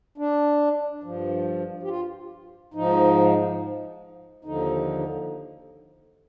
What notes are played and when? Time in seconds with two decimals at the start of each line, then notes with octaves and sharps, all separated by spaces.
0.18 D4
1.04 G2 F3
1.83 G4
1.88 F4
2.74 G#2 F3 D#4
4.44 D#2 D3 F3 D#4